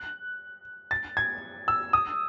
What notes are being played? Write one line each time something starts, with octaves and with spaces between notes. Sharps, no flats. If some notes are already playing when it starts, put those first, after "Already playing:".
Already playing: F#6
A6
G#6
E6
D#6